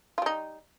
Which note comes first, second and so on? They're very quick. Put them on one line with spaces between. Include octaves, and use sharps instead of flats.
F4 G3 D#4